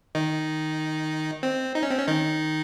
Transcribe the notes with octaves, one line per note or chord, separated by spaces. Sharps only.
D#3 D#4
C4
D#4
C#4
C4
C#4
D#3 D#4